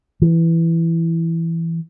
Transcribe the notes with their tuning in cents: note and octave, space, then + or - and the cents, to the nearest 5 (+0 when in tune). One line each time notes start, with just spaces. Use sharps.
E3 +5